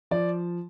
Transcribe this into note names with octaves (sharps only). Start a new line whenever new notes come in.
F3 D5